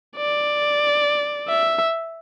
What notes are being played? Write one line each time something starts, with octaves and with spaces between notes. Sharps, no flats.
D5
E5